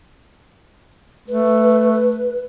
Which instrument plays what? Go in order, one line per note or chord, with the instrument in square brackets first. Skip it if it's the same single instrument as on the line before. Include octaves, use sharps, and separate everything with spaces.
[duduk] A3 [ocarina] B4